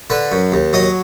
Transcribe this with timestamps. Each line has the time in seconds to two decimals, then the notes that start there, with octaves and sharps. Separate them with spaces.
0.10 D3 B4
0.32 F#2
0.52 D#2
0.73 F#3 D#5